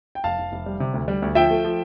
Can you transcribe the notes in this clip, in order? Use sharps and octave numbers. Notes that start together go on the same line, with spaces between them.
G5
F1 F5 A5
F1
F1
G3
C3
D2
G3
D2
F3 E5 G5
A3
F3